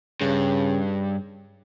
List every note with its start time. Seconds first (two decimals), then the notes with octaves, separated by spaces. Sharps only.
0.21 G2 C#3